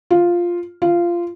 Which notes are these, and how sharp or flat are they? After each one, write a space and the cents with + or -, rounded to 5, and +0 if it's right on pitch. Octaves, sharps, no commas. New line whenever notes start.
F4 +0
F4 -15